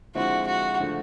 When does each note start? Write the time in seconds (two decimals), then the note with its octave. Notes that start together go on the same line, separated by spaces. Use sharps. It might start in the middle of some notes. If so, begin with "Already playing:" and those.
0.15 D3 F3 G#3 C4 E4 F#4
0.47 F#4
0.80 D3 F3 A3